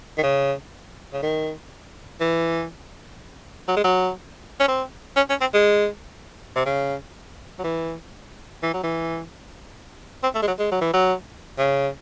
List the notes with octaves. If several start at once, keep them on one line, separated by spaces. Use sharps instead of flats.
D#3
C#3
C#3
D#3
E3
F#3
G#3
F#3
C#4
C4
C#4
C#4
C4
G#3
C3
C#3
F#3
E3
E3
F#3
E3
C4
A3
G#3
F#3
G#3
F#3
E3
F#3
C#3